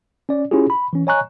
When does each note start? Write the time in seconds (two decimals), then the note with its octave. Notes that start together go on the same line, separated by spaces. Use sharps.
0.29 C#4 D5
0.51 C#4 E4 F4 G4 G#4
0.70 B5
0.93 E3 C#4
1.07 C#5 D#5 G#5 A#5 C#6 F#6